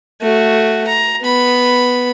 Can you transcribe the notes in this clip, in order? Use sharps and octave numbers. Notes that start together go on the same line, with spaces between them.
A3 F#4
A#5
B3 B5